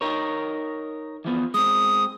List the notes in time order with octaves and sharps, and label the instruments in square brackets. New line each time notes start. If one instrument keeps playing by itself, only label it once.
[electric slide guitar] D#4 A#4 C#5
E3 F3 B3
[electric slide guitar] G#3 C4 [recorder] D#6